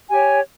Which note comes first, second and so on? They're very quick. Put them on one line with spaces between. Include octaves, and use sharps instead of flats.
G#5 G4 C#5